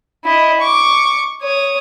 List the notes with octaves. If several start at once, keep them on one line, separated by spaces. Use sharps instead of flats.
E4 D#5
C#6 D6
C#5 D#6